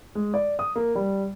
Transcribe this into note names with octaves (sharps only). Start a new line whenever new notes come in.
G#3
D5
D#6
A#3
G3